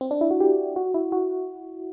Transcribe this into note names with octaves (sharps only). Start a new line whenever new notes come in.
C4
D4
E4
F#4
G4
F#4
E4
F#4